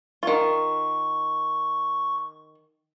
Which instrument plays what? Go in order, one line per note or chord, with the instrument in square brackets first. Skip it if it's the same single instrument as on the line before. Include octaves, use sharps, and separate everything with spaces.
[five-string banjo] D#3 F4 [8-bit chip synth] C#6